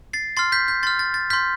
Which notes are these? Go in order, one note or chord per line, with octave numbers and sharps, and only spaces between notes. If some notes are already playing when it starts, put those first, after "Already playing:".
A6 C7
C6 F6 A6 C7
G6 B6
G6 B6
C6 F6 A6
A6
A6
C6 F6 G6 B6